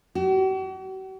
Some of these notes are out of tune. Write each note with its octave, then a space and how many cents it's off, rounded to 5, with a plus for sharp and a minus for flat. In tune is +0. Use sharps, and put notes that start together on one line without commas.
F#4 +45